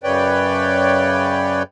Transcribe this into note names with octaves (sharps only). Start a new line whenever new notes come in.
F#2 C#3 B4 C#5 D5 G5